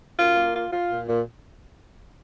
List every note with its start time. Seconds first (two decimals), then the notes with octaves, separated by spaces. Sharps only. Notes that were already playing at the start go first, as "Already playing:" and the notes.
0.18 F#2 F4
0.36 A#3
0.55 F4
0.72 F4
0.91 A#2
1.09 A#2